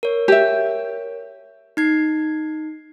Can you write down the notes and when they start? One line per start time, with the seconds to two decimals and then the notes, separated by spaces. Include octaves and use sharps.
0.03 A#4 C#5
0.28 G4 E5
1.77 D#4 G#6 C7